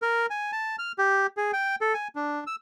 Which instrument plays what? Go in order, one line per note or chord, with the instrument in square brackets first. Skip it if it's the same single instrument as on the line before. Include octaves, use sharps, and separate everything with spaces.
[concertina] A#4
G#5
A5
F6
G4
G#4
G5
A4
G#5
D4
E6